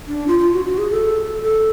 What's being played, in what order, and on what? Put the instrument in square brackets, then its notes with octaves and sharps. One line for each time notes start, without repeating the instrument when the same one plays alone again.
[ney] D4
F4
F4
F#4
F#4
G#4
A4
A4